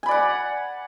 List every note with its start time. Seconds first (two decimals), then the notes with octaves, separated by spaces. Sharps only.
0.03 G#5
0.06 B5
0.08 D5
0.11 F#5